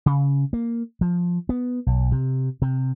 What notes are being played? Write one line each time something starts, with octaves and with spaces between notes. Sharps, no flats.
C#3
A#3
F3
B3
B1
C3
C3